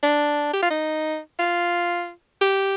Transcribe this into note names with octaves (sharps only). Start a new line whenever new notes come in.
D4
G4
F4
D#4
F4
G4